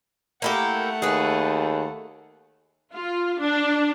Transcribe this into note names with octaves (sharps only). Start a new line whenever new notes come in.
A3 A#3 E4 G4 F#5
D#2 G#4 B4
F4
D4